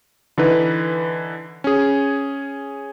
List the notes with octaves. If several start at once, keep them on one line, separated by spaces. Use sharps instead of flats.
D3 E3 D#4 B4
C#4 G#4